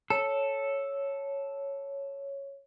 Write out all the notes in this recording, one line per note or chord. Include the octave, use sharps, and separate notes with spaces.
A4 C#5